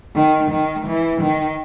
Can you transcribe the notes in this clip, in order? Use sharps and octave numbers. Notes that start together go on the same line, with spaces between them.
D#3
D#3
E3
D#3